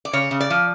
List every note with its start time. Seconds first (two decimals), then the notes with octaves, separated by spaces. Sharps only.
0.05 D5
0.13 C#3 C#5
0.31 C#3
0.40 D5
0.50 F3